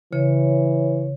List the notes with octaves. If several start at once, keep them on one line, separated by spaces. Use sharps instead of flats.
C#3 E3 C#5